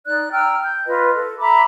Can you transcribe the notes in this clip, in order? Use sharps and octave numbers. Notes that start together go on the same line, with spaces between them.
D#4 D5 F#6
G5 A#5 E6 F6
G6
F4 B4 D#5
A4
E5 A#5 B5 D6